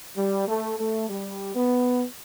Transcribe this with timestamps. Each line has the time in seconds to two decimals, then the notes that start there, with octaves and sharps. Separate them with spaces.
0.17 G3
0.48 A3
0.78 A3
1.09 G3
1.55 B3